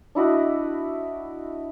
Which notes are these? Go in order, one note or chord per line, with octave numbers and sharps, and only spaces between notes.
D4 E4 F#4 D#5